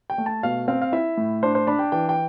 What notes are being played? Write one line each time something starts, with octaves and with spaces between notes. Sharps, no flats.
G5
A3
A5
B2 F5
C4 F5
F5
E4 E5
A2
D4 C5
C5
D4 B5
G5
E3 G5
G5